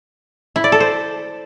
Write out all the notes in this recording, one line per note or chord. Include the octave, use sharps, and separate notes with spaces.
E4
D5
A4
C5